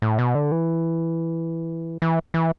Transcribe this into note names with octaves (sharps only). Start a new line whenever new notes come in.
A2
B2
D3
E3
E3
E3